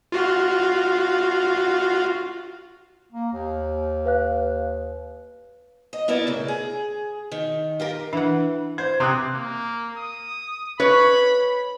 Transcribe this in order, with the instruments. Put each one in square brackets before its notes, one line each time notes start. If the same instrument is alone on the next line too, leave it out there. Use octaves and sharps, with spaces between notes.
[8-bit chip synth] F4 F#4 F5
[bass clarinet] A#3
D#2
[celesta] B4 F5 F#6
[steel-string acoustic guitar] D#5
B3 E4 A#4 D5
A2 C#3
G#4
D#3
F4 G4 A#4
[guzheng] E3 F#5 [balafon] D4
[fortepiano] C5 [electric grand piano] G#6
[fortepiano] C3 [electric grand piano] C6 D#6 F#6
[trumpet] A#3
D#6
[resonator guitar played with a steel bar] B4 C#5 [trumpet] B5